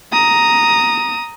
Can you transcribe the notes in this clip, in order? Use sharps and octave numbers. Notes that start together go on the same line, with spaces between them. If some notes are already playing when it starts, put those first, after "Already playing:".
A#5 D#6